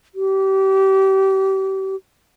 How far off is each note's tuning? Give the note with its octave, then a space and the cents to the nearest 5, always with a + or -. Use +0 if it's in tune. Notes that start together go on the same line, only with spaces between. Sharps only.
G4 -30